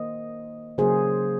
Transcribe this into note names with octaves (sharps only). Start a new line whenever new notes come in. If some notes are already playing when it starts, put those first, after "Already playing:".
Already playing: D#3 A#3 C5 D#5
C#3 F#3 A#3 G#4 C5